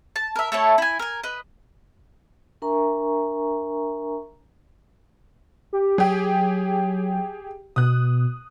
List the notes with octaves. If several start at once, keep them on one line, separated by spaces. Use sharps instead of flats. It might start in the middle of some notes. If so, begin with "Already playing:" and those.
A5
A#4 E5
A3 E4 A4 C#5
E4 G#5
A#4 G#5
B4 D#5
D4 A#4 E5 G#5 A#5 C#6
G4
F#3 G4 G#4
B2 D#6 F#6